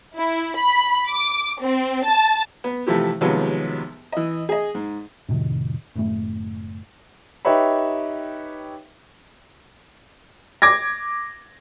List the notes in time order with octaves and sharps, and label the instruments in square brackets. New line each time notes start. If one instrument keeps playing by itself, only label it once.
[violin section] E4
B5
D6
C4
A5
[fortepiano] B3
C3 E3 F3 A3 E4 G4
D#2 C3 F3 F#3 G#3 B3
E3 D#5
G#4 D#5
G#2
[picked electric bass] F2 A2 C3 D#3
F#1 A2 A3
[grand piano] D#4 G4 B4 C#5 E5 B5
[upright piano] D6 G#6 A#6